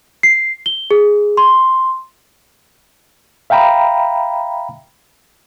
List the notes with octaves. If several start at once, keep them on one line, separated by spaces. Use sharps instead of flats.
C7
G7
G#4
C6
E5 F5 G5 A#5 B5